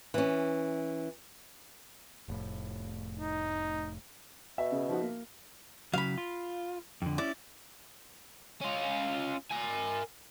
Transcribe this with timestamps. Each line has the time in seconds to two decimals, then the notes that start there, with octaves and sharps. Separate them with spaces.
0.14 E3 C#4
2.28 F1 A2
3.20 D#4
4.58 B2 E5
4.72 C#3
4.89 F3 D#4 F#4
5.01 A#3
5.94 C#3 F#3 F5 B5
6.18 F4
7.02 F2 D3
7.18 C#4 E4 D5
8.61 C#4 F4
9.51 A#4 G#5